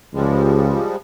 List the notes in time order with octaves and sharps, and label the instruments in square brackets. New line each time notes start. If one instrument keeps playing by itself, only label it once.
[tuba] C#2 [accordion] F3 G3 G#3